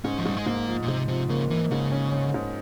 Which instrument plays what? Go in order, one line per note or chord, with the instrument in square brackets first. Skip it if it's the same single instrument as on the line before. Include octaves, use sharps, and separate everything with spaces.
[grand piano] G#2 [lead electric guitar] C#4
[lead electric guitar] F3
[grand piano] G#2 [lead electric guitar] G3
[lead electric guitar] G#3
[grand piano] G#2 [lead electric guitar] A#3
[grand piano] F3
[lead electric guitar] A#2
[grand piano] G#2 [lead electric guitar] C3
[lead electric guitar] C3 [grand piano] F3
[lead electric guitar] C#3 [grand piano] A#3
[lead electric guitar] E3 [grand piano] A#3
[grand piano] G#2 [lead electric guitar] C#3
[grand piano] C#4
C#4
G#2